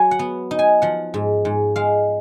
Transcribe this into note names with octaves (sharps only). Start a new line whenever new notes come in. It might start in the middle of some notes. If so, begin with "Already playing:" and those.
Already playing: F#3 G#5
F#5
B3
D#4
G#5
F3 F#5
G#2
G#2
G#3 F5